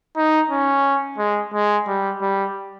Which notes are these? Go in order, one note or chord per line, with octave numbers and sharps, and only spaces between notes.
D#4
C#4
G#3
G#3
G3
G3